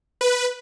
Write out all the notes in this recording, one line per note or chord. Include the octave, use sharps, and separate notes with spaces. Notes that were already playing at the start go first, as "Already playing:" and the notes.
B4